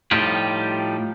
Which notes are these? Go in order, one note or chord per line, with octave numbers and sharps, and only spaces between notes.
A2 F3 G3 D#4 F4 G4